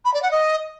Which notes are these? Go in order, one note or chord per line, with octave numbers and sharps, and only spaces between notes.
B5
D5
F#5
D#5